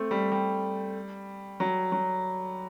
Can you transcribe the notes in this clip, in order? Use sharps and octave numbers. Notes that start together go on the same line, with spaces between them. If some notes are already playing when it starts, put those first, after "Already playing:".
Already playing: A3 C4
G3
G3
F#3
F#3